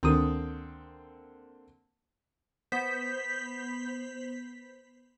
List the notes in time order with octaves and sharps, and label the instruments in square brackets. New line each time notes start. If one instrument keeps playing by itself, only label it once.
[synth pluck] D2 D#3 D#6 [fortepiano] D3 A#3 C4
[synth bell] B3 C5 G6 B6